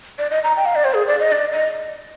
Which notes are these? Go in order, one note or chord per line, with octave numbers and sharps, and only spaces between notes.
D5
D#5
A#5
G5
F5
D5
C5
G#4
D5
D#5
D5
D#5